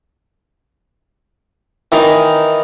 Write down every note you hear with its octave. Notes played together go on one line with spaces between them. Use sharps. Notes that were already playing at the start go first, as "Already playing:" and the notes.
D#3 E3 D#4